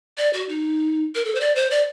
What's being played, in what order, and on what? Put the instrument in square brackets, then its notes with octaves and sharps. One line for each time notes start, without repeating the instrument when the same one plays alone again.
[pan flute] D5
F#4
D#4
A#4
A4
C5
D5
C5
D5